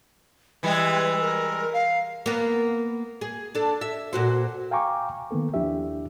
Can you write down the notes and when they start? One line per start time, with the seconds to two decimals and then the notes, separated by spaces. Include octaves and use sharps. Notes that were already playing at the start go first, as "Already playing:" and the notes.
0.63 E3 G3 G#3 B4
1.21 A#4
1.73 F5
2.26 A#3 B3
3.21 G#4
3.55 D4 A4
3.81 E5
4.13 A#2 F#4 C5
4.71 F5 G5 G#5 A#5 C#6 D6
5.31 D#3 A#3 B3 A4
5.54 D#2 F3 D4 E4 G4 E5